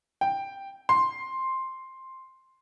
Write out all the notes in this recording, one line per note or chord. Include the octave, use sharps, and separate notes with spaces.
G5
C6